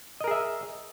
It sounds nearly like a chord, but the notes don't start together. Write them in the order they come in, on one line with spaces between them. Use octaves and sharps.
D#5 A#4 G#4 E5